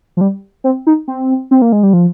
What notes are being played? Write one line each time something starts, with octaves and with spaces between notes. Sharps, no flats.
F3
G3
C4
D#4
C4
C4
A#3
G#3
G3
F3